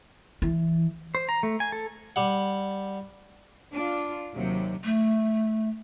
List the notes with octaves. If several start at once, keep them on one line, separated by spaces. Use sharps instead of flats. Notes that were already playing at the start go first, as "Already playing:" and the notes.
E3
C5
A#5
A3
G#5
A4
G3 F#5
D4 F4
D#2 C3 F#3
A3